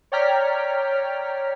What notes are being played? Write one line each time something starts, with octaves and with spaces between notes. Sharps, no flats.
C#5 D5 G5 A#5 F6 B6